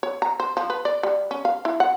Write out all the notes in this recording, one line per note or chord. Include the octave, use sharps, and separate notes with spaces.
C#5
A#5
C5
F3
B4
D5
G3
C#4
F5
E4
F#5